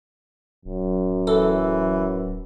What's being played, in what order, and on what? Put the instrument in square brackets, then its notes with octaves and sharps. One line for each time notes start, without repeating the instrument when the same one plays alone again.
[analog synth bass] D1 [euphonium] F#2
[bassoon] E3 [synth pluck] A4